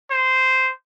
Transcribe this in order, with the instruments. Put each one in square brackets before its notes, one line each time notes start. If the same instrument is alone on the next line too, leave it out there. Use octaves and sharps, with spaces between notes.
[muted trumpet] C5